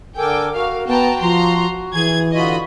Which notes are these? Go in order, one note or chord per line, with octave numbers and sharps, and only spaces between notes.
D3 A4 A#4 G5 G#5 D6
F#4 F5
B3 G5 A5 A#5
F3 A#5 C6
E3 G#4 G#6
D3 F4 F#4 D#5 B5